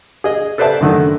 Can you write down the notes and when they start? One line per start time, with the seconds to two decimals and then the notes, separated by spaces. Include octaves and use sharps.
0.24 G#4 D#5
0.58 A4 B4 C5 D5 E5 A5
0.81 F#2 D3 D#3 A3